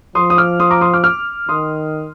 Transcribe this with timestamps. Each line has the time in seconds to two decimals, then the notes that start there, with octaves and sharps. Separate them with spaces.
0.15 F3 C6 D#6
0.30 D#6
0.37 D6 F6
0.60 C6 D#6
0.71 A#5 D6
0.81 C6 D#6
0.93 D6 F6
1.04 D6 F6
1.49 D#3 C6 D#6